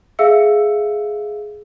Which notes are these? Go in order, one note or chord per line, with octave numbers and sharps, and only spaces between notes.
G#4 E5 F5 E6 C#7